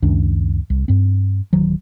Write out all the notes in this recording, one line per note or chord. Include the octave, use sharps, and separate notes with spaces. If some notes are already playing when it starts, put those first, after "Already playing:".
C#2 F#2 D#3 D4
C2
G2 C4
D1 D#3 F#3